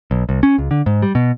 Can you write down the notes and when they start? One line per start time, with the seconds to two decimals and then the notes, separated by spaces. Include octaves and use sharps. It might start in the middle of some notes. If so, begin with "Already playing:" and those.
0.11 B1
0.29 C2
0.43 C#4
0.58 C#2
0.71 D3
0.86 G#2
1.02 G3
1.15 B2